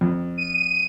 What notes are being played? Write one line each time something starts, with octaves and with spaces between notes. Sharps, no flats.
F2
D#7